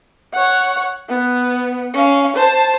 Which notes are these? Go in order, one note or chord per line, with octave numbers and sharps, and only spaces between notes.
C#5 F#5
B3
C#4 F5
C5 A5